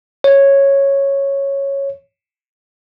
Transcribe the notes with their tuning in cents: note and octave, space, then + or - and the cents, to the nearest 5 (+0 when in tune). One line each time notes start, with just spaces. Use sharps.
C#5 -5